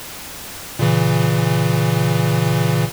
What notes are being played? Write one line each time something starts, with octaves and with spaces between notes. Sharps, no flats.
A#2 C#3 E3